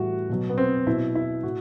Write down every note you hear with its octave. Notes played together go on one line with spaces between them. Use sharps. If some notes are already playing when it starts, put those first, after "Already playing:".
Already playing: A2 E3 G3 F#4
B2 F#3
B3
C4
B2 F#3 E4
E4
A2 F#4